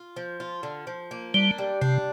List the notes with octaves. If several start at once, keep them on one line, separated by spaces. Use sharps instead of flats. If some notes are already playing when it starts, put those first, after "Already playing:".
Already playing: F4
F3
F4
D3
F3
A#3
G3 D4
G3
C3 D4